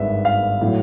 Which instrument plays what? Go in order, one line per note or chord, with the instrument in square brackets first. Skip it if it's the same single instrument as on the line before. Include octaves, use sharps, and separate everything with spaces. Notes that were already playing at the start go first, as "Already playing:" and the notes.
Already playing: [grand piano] G#1 G2 D#3 G#3 B4 E5
F5
A2 F#3